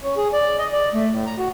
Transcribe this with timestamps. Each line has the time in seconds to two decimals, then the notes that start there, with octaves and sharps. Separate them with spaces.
0.03 C#4
0.17 G#4
0.33 D5
0.59 D#5
0.73 D5
0.94 A3
1.10 A2
1.26 A#5
1.38 F#4